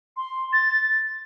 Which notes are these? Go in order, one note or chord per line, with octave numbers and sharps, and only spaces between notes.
C6
A6